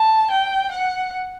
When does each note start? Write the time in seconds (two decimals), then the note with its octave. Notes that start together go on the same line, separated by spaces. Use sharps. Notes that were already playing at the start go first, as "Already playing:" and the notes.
Already playing: A5
0.30 G5
0.71 F#5